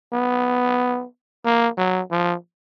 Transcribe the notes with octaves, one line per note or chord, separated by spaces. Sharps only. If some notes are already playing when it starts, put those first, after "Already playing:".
B3
A#3
F#3
F3